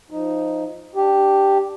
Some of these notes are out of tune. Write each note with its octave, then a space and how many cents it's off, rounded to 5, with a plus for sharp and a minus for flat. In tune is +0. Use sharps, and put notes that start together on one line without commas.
F3 -5 D#4 +0
D4 +0 G4 +0